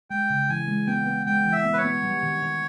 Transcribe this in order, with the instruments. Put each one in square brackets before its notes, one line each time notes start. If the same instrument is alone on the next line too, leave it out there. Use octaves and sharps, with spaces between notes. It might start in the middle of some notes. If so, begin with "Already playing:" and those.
[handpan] G#3 [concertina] G5
[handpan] C#3
[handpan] E3 [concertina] G#5
[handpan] G#3
[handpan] B3 [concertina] G5
[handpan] B3
[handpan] G#3 [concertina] G5
[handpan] E3
[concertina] E5
[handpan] B3
[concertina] B4
C#5
[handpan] B3
G3
D#3
D#3